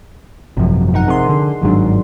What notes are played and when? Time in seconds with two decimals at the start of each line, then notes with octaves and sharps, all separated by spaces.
0.57 G#1 F#2 C3 F3
0.94 D#4 A#4 F#5
1.08 C3 G#4 C6
1.29 D3
1.62 G1 G#2 D#3 F#3 D4